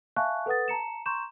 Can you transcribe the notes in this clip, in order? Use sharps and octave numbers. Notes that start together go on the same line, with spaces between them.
E5 F5 G#5 A5 C#6 F#6
A4 B4 F#5 D#6 A6
A5 A#5 C#7 E7
A#5 C6 C#6 G6 E7